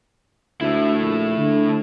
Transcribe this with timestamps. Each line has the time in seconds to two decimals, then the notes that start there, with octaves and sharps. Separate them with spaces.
0.61 D2 A3 E4
1.02 A#1
1.37 D3